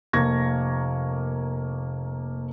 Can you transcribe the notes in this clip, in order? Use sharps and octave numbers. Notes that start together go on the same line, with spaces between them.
F1 A#3 C#6 G#6 A#6